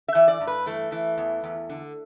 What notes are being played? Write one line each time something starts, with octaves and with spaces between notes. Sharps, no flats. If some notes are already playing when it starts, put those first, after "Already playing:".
E5
E3
D5
G2
B4
E3 A3
E3
E2
E2
D3